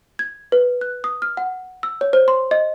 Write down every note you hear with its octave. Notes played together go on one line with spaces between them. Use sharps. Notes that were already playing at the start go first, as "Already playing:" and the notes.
G#6
B4
F#6
D#6
F6
F#5
E6
C#5
C5
C6
D#5